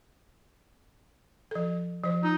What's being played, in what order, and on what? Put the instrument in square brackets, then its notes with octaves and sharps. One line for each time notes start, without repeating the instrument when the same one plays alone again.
[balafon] F3 A4
F3 C5
[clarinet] D#4 [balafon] F4